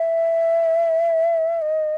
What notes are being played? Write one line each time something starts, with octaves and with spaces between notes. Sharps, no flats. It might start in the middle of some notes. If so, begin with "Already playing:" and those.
Already playing: E5
D#5